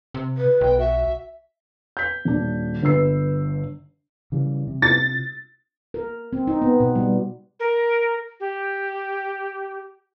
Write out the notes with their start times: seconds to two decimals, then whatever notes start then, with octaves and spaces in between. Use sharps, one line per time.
0.14 C3
0.37 B4
0.61 B1 G5
0.79 F#4 E5
1.97 G6 B6
2.25 D#1 D4
2.83 G1 G2 B4 E6 C7
4.32 C#3 E3 G3
4.67 C3
4.82 A6
5.94 A#4
6.33 C4
6.48 D#4
6.62 B3
6.80 B2
6.96 G3
7.60 A#4
8.40 G4